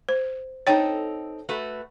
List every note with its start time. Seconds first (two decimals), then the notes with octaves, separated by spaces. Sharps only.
0.09 C5
0.67 C4 D#4 A4 C#5 G5
1.49 A3 F#4 B4